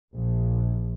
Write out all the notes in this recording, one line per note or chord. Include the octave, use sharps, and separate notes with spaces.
A#1